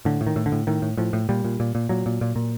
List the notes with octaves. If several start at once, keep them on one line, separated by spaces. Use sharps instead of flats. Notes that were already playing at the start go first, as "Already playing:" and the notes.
A2 D3
A2
D#3
A2
D3
A2
A2 D#3
A2
A2 F3
A2
A#2 G3
A#2
A#2
A#2
A#2 F#3
A#2
A#2
A#2